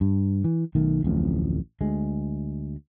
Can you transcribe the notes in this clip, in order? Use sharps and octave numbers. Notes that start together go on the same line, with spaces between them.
G2
E3
B1 D#3 A3
D1 A1 F2
D2 G#3